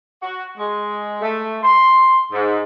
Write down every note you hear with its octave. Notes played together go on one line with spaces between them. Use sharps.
F#4
G#3
A3
C6
G#2